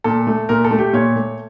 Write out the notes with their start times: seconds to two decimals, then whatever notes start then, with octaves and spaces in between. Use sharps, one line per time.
0.04 A#2 A4
0.27 A3
0.49 A#2 A#4
0.64 A4
0.71 A3
0.79 G4
0.93 A#2 C#5
1.16 A3